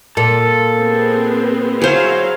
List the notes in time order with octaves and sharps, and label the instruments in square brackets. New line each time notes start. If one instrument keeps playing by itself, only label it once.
[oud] A#2 [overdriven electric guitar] A4
[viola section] B3 C4 G#4
[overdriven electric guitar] F#3 [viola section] E4 C#5 F5 [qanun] G#4 C5